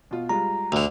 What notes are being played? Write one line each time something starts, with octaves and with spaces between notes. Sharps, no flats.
B2 F4
G3 G#3 F4 A#5
D2 D3